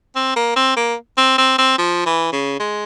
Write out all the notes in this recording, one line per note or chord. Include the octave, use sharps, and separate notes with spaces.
C4
A#3
C4
A#3
C4
C4
C4
F3
E3
C#3
G#3